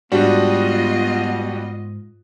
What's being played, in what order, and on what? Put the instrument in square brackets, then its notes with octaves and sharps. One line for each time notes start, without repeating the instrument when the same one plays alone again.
[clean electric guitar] G#2 [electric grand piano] G3 D4 F#4 [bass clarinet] B3 [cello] F4 D#5